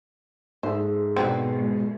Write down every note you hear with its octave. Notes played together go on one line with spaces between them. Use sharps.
G#2 G#4 A4 C5 E5
B2 D3 F#3 G#3 C4